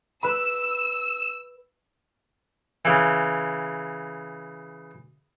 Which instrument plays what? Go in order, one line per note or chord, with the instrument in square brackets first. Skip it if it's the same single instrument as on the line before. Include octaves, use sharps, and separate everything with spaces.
[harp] B4 B5 [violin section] E6
[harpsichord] C#3 E3